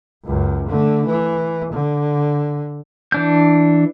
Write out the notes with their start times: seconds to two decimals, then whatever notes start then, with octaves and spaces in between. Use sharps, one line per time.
0.25 C#2 F#2
0.68 D3 A3
1.06 E3
1.73 D3
3.12 E3 D4 G6